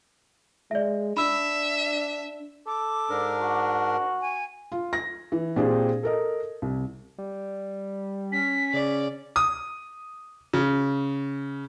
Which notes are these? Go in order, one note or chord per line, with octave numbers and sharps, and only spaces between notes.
G#3 D5 E5
D4 E5 B5 E6
A4 D6
G#2 D4 A#4
F#4
G#5
F4
A#6
E3
A#2 C4 D4 G4 G#4
A4 A#4 D#5
C2
G3
C#4 B6
C#3 D5
D#6
C#3